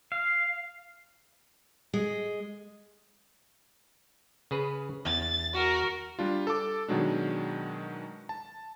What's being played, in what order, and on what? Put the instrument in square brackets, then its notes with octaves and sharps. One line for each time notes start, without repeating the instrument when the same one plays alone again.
[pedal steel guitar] F5
[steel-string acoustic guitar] G#3
[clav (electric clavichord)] C#3 G#4 B4
[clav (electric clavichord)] E2 [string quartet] A6
[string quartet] F#4 A#4
[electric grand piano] G3 D4 F4
A4 A5 D6
B2 D#3 F#3 G#3 D4
A5